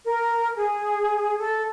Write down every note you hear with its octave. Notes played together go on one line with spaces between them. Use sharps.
A#4
G#4
A4